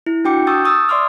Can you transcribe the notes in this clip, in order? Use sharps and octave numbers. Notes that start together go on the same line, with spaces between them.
E4
D4 F#4 G5 D6 C#7
A5 C#6 D#6 E6 G6 A6
C#6 D#6 E6 A6
D5 E5 C6 D6 D#6 F6